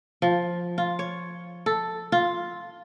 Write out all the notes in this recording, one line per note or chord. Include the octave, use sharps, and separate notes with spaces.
F3
F4
C#5
A4
F4